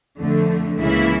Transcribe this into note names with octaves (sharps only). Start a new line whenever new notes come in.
F2 D3 A3
C#2 C#3 E3 A#3 E4